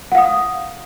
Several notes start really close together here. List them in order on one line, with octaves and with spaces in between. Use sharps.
F#5 F5 D#6